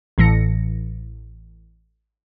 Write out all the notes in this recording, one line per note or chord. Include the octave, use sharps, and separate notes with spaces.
A1 A2 E3 A#6 C#7